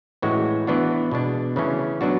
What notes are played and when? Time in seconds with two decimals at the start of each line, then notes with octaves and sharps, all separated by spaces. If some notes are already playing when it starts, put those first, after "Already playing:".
0.22 A2 E3 G#3 C#4 F#4
0.67 E3 B3 D4 F#4
1.11 B2 G#3 D4
1.56 C#3 E3 A3 C#4
2.01 F#3 B3 D4 F#4